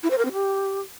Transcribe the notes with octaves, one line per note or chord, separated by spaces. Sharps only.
E4
C5
A#4
C4
G4